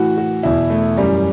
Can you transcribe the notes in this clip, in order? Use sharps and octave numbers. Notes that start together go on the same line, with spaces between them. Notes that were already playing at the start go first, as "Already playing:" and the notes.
Already playing: A2 E3 F#4
F#4
E2 B2 E4
A3
F#2 E3 G3